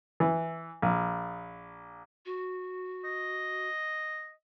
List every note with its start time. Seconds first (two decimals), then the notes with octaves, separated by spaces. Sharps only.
0.20 E3
0.82 A#1
2.26 F#4
3.04 D#5